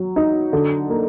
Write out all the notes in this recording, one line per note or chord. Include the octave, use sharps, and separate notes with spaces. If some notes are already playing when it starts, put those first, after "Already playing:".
Already playing: F#3
D#4
D3
A#3